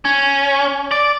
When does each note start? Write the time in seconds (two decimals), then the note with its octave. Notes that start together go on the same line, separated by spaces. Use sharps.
0.05 C#4
0.91 D5